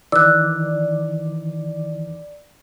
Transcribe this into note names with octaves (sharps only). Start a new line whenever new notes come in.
D#3 E3 D#4 D5 E6 F#6